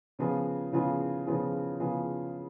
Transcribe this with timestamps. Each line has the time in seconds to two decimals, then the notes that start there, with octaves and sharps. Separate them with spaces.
0.19 C#3 F3 B3 F4 G#4
0.73 C#3 F3 B3 F4 G#4
1.26 C#3 F3 B3 F4 G#4
1.80 C#3 F3 B3 F4 G#4